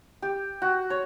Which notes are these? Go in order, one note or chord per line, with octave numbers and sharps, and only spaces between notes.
G4
F#4
C#5